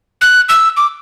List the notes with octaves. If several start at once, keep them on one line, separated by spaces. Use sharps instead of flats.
F#6
E6
D6